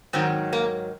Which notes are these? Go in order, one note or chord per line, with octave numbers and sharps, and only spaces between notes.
G#2 D#3 F#3 C4
A#3